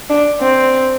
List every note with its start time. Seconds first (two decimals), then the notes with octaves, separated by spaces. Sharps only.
0.10 D4
0.41 C4